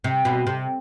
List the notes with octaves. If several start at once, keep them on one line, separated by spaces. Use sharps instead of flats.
C3
B2
C3